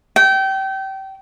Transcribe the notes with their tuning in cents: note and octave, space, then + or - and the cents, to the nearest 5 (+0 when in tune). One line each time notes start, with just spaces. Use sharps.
G5 -25